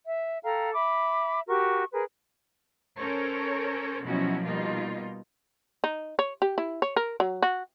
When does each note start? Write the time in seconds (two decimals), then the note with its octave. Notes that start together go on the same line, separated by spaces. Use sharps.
0.05 E5
0.44 A4 F5 G5 A#5
0.73 E5 B5 D6
1.48 F#4 G4 A#4 C#6
1.92 G#4 A#4 B4
2.99 C#4 A4 A#4 C5 C#5
4.03 B2 F3 F#3 C#4 E4 F#4
4.43 B2 G3 A#3 D#4 F4
5.84 D#4
6.19 C#5
6.42 G4
6.58 E4
6.82 C#5
6.96 A#4
7.20 F#3
7.42 F#4